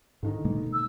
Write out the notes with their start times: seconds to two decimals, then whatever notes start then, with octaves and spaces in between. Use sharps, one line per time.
0.23 G#2 D3 D#3 D#4
0.45 B2 G#3 A#3
0.73 E6